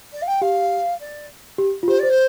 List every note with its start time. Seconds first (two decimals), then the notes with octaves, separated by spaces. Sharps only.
0.13 D5
0.22 F5
0.27 G5
0.42 G4 F5
1.00 D5
1.58 G4
1.83 F4
1.88 G4 C5
1.99 C5 D5
2.09 C5